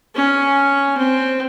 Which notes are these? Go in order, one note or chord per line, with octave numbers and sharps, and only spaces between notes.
C#4
C4